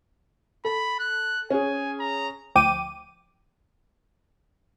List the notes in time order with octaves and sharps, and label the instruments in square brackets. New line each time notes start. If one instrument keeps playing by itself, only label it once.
[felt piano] A4 [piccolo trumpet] B5
[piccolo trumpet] F#6
[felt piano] C#4 G#4 [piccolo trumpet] G#5
[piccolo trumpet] A#5
[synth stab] D2 F3 G5 D6 D#7